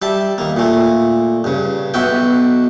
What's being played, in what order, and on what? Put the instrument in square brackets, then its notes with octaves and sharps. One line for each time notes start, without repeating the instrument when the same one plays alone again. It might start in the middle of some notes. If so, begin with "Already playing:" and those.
[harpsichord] G3 E5 A5
D#2 A#3
A#2 A3
G2 C#3
B1 B2 F#4 E5 G5